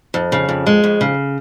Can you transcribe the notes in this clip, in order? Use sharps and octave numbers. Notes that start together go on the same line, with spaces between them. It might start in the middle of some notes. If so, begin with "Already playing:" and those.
F2
C#3
F2
G#3
F2
C#3